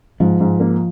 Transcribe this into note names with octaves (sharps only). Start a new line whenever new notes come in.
G#2 F3
G#2
A#3